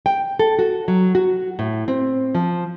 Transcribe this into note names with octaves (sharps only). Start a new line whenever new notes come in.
G5
A4
F#4
F#3
F#4
A2
C4
F3